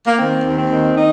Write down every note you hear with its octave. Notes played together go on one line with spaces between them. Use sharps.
A#3
D#3 C4
D#2
C4
D#3
D#4